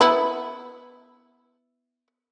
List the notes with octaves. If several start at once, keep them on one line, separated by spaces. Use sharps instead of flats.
B3 E4